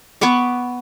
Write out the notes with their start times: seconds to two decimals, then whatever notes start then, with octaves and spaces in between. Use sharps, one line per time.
0.21 B3 B4 C#6 D6